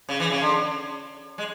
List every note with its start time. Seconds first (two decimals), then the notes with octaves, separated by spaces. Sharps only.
0.09 C#3
0.20 E3
0.31 C#3
0.41 D3
1.38 G#3